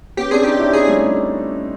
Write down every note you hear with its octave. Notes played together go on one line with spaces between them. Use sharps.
B3 C#4 G4
C4 D4 G#4
C#4 D#4 G4
D4 E4
C#4 D#4 G#4
G3 A3